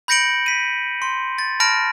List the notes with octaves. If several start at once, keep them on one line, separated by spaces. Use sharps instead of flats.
B5 G6 A#6 C#7 D7 F#7
B6 D#7
C6
A6
A5 B5 F6 A#6 D7